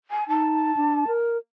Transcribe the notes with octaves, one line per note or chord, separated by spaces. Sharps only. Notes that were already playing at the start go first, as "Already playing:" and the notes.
G#5
D#4 A5
D4
A#4